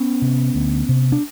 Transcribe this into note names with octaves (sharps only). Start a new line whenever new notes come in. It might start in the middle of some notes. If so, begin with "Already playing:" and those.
Already playing: B3 C#4
C3
D2
C3
D4